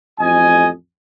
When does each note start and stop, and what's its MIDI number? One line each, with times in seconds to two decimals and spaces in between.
0.20 0.68 33
0.20 0.68 41
0.20 0.68 75
0.20 0.68 80